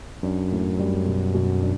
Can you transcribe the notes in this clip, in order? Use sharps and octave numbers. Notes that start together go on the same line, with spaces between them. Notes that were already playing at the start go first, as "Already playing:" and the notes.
F#2 D4
A2
G3
B2
B2
D4